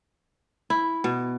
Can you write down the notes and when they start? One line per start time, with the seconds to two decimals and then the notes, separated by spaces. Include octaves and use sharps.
0.70 E4
1.04 B2